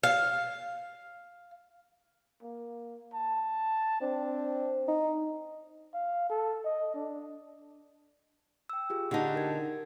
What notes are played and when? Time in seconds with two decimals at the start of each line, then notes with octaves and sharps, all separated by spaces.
0.03 F5
2.43 A#3
3.14 A5
4.01 C4 D4
4.88 D#4
5.94 F5
6.30 A4
6.65 D#5
6.95 D4
8.69 G5 E6
8.90 F4 G4 G#4
9.11 D3 D#4 G4 F#5 A5
9.36 A#4 G#6